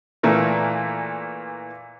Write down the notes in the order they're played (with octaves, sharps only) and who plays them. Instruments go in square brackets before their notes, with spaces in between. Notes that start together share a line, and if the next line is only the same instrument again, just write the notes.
[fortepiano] A#2 E3 A3 A#3